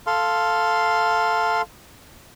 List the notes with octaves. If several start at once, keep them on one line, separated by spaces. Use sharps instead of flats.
A4 F5 C6